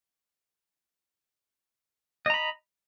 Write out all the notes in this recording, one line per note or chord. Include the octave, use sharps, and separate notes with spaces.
D#5 A#5 B5